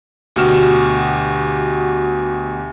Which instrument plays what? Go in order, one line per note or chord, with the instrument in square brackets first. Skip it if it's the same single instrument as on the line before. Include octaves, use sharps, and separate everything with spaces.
[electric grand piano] D2 B2 F#4 G4 F6 E7